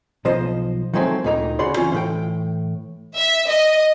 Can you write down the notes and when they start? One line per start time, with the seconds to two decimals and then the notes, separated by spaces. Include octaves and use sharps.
0.25 B1 F3 C5 D#5
0.93 D#3 F3 F#3 G#3 A3 C4
1.24 D2 A#2 D#3 D#4 A#5
1.59 C#2 C#3 F#4 D5 B5 C6
1.77 E3 C#4 F4
1.92 A2 E3 G5
3.15 E5
3.47 D#5